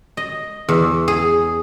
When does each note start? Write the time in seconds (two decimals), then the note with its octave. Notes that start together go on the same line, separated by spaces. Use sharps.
0.17 D#5
0.69 E2
1.08 G#4